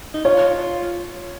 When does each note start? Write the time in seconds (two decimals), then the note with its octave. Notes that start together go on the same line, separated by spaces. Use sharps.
0.14 D#4
0.24 F4 C#5